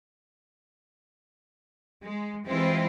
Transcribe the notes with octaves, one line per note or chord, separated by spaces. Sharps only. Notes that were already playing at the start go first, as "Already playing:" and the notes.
G#3
E3 G3 G#3 C4 E4 F4